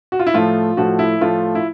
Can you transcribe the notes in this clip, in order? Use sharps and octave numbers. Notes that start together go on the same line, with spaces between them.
F#4
F4
E4
A2 F3 A3 F4
A2 F3 A3 F#4
E4
A2 F3 A3 F4
E4